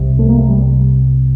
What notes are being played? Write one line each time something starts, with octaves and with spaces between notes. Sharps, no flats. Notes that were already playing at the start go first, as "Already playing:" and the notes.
Already playing: C2 C3
A3
A#3
A3
G3